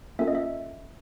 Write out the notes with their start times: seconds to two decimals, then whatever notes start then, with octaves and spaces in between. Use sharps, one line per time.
0.19 A#3 C#4 F4 A4 E5
0.28 D#5
0.35 E5